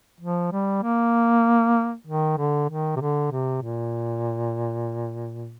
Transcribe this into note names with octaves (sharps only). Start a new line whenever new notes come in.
F3
G3
A#3
D#3
D3
D#3
C3
D3
C3
A#2